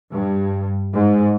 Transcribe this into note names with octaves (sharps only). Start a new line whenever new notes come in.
G2
G#2